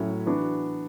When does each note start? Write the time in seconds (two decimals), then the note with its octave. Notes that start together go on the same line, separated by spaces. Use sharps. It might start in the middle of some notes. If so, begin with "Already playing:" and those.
Already playing: A2 F#3 C#4 E4
0.26 E3 B3 D4 F#4